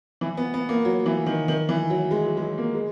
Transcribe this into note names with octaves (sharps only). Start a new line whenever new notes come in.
E3
B3
B3
A#3
F#3
E3
D#3
D#3
E3
F#3
G#3
F#3
G#3
F#3
A#3
G#3